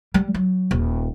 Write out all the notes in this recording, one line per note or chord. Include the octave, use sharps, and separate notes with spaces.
G3
F#3
D#1